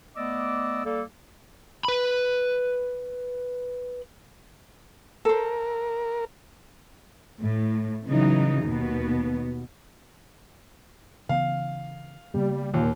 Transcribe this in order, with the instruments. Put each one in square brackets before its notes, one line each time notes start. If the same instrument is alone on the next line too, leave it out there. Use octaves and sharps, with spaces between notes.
[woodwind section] A3 B3 D5 D#5 D6 E6
G3 A#3 A4
[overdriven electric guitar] B4 B5
[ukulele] A4 C5 [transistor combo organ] A#4
[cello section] A2
C#3 E3 F#3 D#4
D#2 B2 B3
[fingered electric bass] C#3 E3 B3 [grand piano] F5
[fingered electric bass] C#3 A#3 B3 [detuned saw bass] G3
[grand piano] D#2 [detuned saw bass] A#2